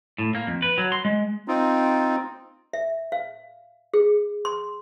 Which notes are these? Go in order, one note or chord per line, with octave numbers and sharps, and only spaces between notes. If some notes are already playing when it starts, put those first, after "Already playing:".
A2
A#3
F2
B4
F#3
C6
G#3
C4 D#4 F4
E5
F5
G#4
C6